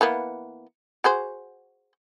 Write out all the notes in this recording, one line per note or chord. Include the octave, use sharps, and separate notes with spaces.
E3 A#3 B3
F#4 G#4 C5